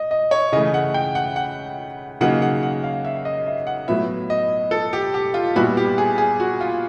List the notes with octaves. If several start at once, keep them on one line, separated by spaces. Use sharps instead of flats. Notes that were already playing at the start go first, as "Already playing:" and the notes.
Already playing: D#5
D#5
C#5
C#3 E3 A3 D#5
F#5
G5
F#5
F#5
C#3 F#3 A#3 D#4 F#5
F#5
F#5
F5
E5
D#5
E5
F#5
A2 F#3 B3 E4 E5
D#5
A4
G4
G4
F4
A#2 G3 B3 E4 F#4
G4
G#4
G#4
F#4
F4